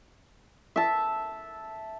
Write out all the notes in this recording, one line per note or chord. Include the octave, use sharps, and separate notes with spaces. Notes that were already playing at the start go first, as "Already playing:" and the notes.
E5 A5